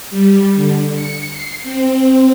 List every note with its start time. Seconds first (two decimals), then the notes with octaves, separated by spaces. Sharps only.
0.10 G3
0.55 D3
0.93 C#7
1.31 C7
1.63 C4